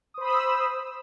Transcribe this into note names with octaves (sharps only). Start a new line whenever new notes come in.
C5 B5 D#6 E6